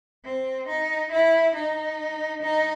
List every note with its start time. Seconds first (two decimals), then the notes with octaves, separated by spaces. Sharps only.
0.25 C4
0.68 D#4
1.12 E4
1.55 D#4
2.42 D#4